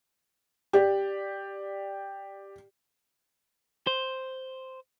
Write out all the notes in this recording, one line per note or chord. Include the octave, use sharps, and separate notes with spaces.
G4 D5
C5